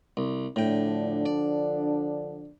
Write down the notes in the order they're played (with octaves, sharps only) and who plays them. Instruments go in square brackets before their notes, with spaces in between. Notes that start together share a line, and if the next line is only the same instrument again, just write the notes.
[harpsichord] C2
[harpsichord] A2 G5 [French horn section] D3 F3 D4
[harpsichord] D5